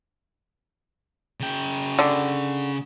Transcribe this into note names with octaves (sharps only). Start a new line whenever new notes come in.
C#3 G5
D3